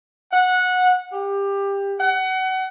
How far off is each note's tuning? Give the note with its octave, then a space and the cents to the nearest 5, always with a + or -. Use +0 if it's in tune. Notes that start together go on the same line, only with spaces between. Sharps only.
F#5 -15
G4 +20
F#5 +25